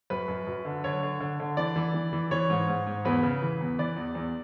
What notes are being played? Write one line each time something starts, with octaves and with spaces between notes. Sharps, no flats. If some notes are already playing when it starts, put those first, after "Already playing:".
F#2 B4
F#2
F#2
D3
D3 C#5
D3
D3
D3
E3 D5
E3
E3
E3
E3 C#5
G#2
G#2
G#2
E2 B4
C#3
E3
E2
E3 D5
E2
E2